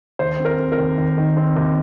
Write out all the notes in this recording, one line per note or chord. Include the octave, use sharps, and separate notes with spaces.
D#2 C5
C4
A#4
C4
A#4
D#2
D#2
D#3
C4
D#2